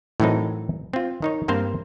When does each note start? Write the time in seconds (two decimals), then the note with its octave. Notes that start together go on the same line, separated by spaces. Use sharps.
0.20 A2 D#3 E3 F#3 C4 D#4
0.93 C4 F4
1.22 D#3 D#4 C#5
1.48 G2 A#3 C4 C5 F5